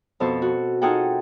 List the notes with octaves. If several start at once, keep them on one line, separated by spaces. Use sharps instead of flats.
F2 B2 A4 C5
F#4
D#4 F4 G#4 A4 F#5 G5